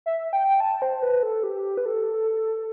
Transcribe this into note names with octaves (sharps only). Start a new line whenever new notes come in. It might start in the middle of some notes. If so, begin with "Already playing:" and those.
E5
G5
A5
C5
B4
A4
G4
B4
A4